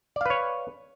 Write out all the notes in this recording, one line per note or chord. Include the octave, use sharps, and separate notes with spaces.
B4 C#5 D5 F5